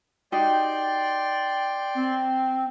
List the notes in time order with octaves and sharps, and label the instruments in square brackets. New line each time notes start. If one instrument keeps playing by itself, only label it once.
[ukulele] D#4 F#4 G4 [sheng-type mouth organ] D5 G5 C6
[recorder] C4